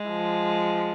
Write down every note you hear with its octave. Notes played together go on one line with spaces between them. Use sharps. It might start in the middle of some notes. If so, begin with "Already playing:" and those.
Already playing: G#3
F3